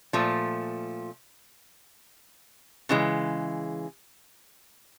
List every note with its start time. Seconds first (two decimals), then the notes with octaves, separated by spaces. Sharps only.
0.13 A#2 F3 A3
2.89 C#3 E3 G#3